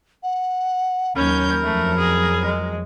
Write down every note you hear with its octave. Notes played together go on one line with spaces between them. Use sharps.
F#5
D#2 F#3 C#4 A#4 B5 G6
F2 F#3 A3
G#4
G#3